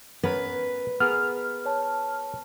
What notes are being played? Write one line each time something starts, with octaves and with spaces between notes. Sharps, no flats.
B3 C#4 A#4 B4
B3 G#4 A#4 F6
C#5 A5